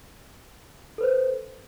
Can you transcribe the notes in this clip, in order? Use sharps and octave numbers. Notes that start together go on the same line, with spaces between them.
A4 B4 C5